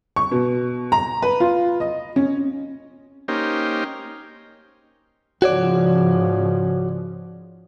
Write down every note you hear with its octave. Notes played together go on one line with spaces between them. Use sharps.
C#6
B2
A#5
B4
F4
D#5
C#4
A#3 C#4 D#4 G4 C5
G#2 C#3 F3 F#4 C#5 D5